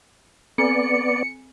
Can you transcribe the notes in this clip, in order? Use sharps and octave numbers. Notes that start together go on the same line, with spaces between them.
B3 C4 D5 G#5 C#7